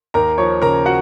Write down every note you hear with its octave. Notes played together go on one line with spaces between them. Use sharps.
D#2 A#4 A#5
F3 C#5 C#6
C#3 A#4 A#5
F#4 F#5